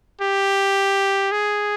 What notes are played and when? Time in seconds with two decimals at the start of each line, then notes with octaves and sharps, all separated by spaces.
0.21 G4
1.32 G#4